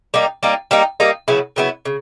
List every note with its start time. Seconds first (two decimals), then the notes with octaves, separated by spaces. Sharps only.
0.14 G3 A#3 D#4
0.43 G3 A#3 D#4
0.71 G3 A#3 D#4
1.00 G3 A#3 D#4
1.28 C#3 F#3 B3 E4
1.56 C#3 F#3 B3 E4
1.85 C#3